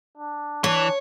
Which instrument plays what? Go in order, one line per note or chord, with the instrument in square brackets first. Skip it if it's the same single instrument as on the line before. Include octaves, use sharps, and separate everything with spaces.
[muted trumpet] D4
[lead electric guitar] E3 [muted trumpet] D4 [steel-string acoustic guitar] C#5